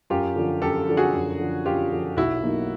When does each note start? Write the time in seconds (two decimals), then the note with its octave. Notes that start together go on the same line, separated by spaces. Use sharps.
0.10 F#2 F4 G4
0.36 D3 F3
0.62 F#2 G4 A4
0.88 D3 F3
0.97 F#4 G#4
1.14 F#2
1.40 D3 F3
1.66 F#2 F4 G4
1.91 D3 F3
2.17 B1 E4 F#4
2.43 B2 F#3 A#3 D#4